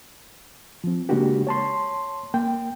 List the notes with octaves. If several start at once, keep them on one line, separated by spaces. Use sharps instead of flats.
F3 C4
C#3 G#3 A#3 D4 F#4 G4
C#5 A5 C6
A#3 G5